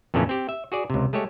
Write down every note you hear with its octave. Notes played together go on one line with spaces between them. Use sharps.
F2 A#2 C#3 E3 A3 C#4
C4 G4
E5
F#4 G#4 D5
C#2 C3
G#3 A3 G4 C#5